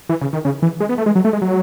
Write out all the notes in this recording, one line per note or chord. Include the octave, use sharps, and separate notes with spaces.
E3
C#3
D#3
C#3
E3
G#3
B3
A3
G#3
F#3
A3
G#3
F#3